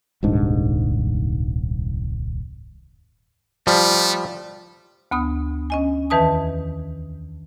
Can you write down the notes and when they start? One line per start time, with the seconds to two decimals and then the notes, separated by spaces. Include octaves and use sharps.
0.23 D#1 C2 G#2 D4
3.67 F3 G3 A3
5.11 D2 B3 D#6
5.70 C#4 D#5 G#5
6.10 E2 D#3 E3 B4 A5 D#6